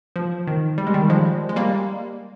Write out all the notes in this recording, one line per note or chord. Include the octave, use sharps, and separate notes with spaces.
F3
D#3
G3
G#3
D#3 G3
F3 G#3
G#3
G3 A#3